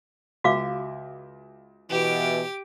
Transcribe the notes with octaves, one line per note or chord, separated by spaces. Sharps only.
C#2 F#4 E5 F5 D6
B2 E3 G4 D7